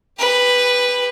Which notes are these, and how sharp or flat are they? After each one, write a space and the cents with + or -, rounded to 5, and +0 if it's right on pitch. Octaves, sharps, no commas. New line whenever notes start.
G4 +35 B4 +0